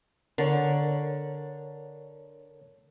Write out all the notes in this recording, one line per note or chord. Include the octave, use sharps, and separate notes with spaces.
D3 A#4 C#5